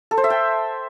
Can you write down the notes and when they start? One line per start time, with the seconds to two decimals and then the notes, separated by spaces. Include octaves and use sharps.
0.11 A4
0.17 C5
0.24 E5
0.30 G5